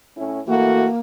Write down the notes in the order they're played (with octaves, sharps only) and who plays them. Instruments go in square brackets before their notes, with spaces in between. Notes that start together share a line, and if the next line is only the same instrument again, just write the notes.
[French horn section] A2 C#4 E4
[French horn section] E3 A3 F#4 [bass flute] A#3